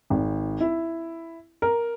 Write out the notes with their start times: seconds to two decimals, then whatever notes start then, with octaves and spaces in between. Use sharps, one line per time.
0.10 G#1
0.61 E4
1.62 A#4